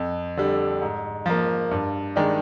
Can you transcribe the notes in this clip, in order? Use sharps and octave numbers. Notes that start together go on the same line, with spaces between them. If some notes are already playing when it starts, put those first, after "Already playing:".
Already playing: F2
D3 G3
G#2
F3 A#3
G2
D#3 G#3 D4